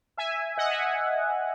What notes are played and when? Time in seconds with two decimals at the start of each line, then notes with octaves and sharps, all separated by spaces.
0.17 E5 G#5
0.57 D#5 F#5
0.70 E5 G#5